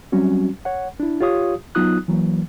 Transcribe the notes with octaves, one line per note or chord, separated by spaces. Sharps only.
F#3 G3 C4 C#4 F#4
C#5 F#5
D4 E4
F4 G4 C#5 F5 D#6
F#3 B3 D#4 F4 D#6 F#6
E3 F#3 A#3